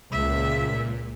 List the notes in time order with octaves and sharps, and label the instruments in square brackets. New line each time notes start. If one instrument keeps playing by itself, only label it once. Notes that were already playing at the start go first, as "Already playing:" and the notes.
[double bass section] C#2 [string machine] A#2 [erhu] E5